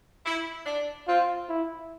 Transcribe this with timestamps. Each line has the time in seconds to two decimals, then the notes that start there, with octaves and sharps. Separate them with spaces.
0.25 E4
0.66 D4
1.07 C4 F4
1.49 E4